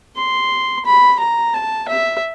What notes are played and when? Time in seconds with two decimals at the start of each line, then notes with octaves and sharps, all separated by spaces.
0.17 C6
0.85 B5
1.20 A#5
1.54 A5
1.88 E5